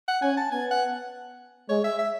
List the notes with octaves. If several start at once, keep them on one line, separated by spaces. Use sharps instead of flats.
F#5
C#4 G#5
A5
B3 G#5
F#5
G#3 C#5
E5
E5